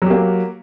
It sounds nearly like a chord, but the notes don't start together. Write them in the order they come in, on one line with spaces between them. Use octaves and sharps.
F#3 G4 A#3